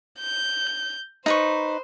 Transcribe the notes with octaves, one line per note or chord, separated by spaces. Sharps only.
G6
D#4 B4 C5 C#6